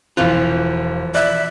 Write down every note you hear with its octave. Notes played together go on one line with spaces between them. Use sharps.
E1 E3 F3 F4 F#6
D5 E5 F#6